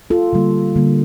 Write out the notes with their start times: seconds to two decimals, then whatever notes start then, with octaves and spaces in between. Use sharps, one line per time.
0.10 F4 A4
0.33 D3 G3 A#3
0.76 D3 G3 A#3